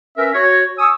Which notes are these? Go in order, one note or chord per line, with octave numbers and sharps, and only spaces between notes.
C#4 A#4 B4 E5
F#4 C#5
G#5 C#6 D#6 E6